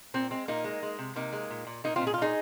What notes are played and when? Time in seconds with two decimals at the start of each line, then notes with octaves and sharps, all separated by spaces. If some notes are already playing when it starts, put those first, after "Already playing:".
0.14 A#2 C4
0.31 G#3 C4
0.48 A#2 A#3 D#4
0.64 G#3
0.83 G#3
0.99 C3
1.16 C3 A#3 D#4
1.33 G#3
1.50 A#2
1.67 A#2
1.84 A#2 A#3 D#4
1.96 C4 F4
2.01 A#2
2.07 G#4
2.14 F4
2.18 A#2 D#4 G#4